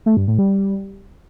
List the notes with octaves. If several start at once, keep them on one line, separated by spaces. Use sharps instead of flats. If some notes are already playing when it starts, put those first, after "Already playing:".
A3
G2
A2
G3